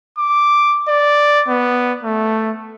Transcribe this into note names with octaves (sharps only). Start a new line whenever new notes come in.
D6
D5
B3
A3